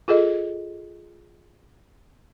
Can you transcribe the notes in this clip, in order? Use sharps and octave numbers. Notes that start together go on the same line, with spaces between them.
F4 G#4 A4 D#5